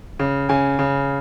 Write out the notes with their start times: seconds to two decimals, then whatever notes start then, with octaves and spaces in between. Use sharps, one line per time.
0.19 C#3
0.49 C#3 G#5
0.79 C#3